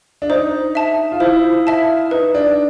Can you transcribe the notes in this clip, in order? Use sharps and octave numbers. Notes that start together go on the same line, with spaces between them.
D4
D#4 C5
E5 A5
F4
E4 C5
E5 A5
D#4 B4
D4